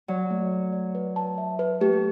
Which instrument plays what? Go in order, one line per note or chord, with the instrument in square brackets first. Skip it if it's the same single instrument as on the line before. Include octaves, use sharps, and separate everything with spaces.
[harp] F#3 [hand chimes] D5
[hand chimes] A3
A3
D5
B4
A5
E5
B4
[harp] A3 [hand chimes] G4
[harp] A3